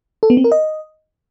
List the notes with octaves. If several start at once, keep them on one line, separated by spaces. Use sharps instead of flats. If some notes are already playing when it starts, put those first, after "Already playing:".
A4
B3
C4
A#4
D#5